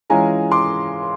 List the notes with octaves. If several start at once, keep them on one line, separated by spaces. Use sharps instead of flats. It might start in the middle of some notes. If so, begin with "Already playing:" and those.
E3 G#3 C#4 F4 G#5 A#5
C6 D6